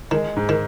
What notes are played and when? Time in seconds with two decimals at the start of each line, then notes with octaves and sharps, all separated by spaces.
0.11 D#3 G#3
0.37 G#2
0.49 D#3